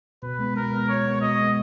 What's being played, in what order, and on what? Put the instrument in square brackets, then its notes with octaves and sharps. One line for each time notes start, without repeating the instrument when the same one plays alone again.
[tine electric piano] B2 [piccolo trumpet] B4
[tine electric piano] G#3 B3
[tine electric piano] B2 [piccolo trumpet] A#4
[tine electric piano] G#3 B3
[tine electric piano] B2 [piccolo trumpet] C#5
[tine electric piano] G#3 B3
[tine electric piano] B2 [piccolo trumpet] D#5
[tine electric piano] G#3 B3